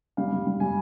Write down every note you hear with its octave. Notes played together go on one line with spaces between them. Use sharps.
G3 F5
G3
G3
G3 G#5